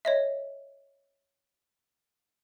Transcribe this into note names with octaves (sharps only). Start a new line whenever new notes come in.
C#5 D#5 E5